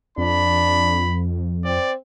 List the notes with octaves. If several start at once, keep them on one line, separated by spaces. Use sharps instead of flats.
F2 D4 B5
C4 D5